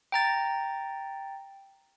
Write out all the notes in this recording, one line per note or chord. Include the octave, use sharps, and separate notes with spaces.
G5 A#5 A6